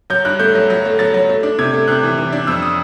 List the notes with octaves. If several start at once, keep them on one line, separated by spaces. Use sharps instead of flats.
F#3 G6
G2 F#6
A3 G6
F#3
F#3
A3
F#3 A6
F#3
A3
D4
C3 G#6
A3
C3 F#6
E3
E3
D4
F2 E6
D#6